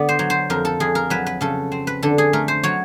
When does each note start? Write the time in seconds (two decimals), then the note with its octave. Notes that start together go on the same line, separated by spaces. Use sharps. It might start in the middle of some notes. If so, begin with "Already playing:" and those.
Already playing: D3 B3 D5
0.09 C5
0.19 F#3
0.30 C5
0.50 F2 A#4
0.65 A4
0.80 F2 G#4
0.95 A#4
1.10 F#3 B4
1.26 B4
1.41 C#3 A4
1.72 C4
1.87 B4
2.03 D3 A4
2.18 G#4
2.33 A3 A#4
2.48 C5
2.63 F#3 C#5